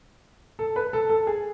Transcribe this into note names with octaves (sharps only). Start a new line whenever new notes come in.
A4
B4
A4
A4
G#4